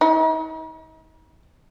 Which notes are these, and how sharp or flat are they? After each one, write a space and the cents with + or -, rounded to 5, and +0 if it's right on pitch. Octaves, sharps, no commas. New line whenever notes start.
D#4 +40